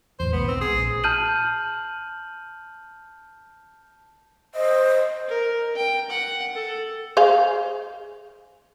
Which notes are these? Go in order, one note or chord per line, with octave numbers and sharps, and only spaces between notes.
E2 A2 C5
B1 G#3 B3
C4
G#4
A#1
A5 F6 G6 D#7 F#7
C5 D#5
A#4
G5
F#5
A4
G#4 C5 F5